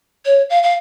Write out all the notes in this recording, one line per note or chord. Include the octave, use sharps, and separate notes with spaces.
C#5
F5
F5